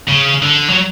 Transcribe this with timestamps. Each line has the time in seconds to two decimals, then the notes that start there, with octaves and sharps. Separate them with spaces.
0.08 C#3
0.42 D3
0.69 F#3